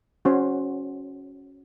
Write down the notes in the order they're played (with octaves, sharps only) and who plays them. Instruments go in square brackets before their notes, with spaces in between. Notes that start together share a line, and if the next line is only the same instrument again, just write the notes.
[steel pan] C#4 F#4 C5 F#5